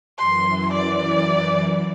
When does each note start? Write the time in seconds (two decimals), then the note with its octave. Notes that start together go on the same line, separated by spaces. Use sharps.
0.19 F#2 E3 C6
0.73 D5